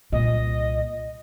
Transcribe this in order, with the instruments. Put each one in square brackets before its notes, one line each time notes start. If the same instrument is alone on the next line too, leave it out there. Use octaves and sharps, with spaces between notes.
[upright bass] C2 A#2 [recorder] D#5